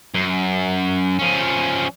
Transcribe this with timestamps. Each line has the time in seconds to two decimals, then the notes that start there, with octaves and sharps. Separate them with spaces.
0.14 F#2
1.19 F3 C#4